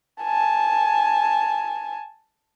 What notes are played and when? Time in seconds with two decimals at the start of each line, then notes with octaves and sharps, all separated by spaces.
0.22 G#5 A5